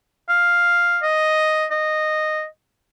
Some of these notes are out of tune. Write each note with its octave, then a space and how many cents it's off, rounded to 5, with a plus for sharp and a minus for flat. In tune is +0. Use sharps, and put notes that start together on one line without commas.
F5 +0
D#5 +0
D#5 -10